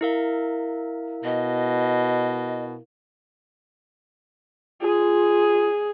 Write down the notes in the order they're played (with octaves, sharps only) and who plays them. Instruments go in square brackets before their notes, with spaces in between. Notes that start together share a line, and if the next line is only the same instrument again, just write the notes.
[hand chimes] E4 A#4 F5
[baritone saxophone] B2 [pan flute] D#5
[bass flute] F4 [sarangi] G#4